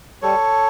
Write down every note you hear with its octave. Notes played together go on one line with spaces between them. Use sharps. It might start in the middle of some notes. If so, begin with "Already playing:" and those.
G3 A4 C#5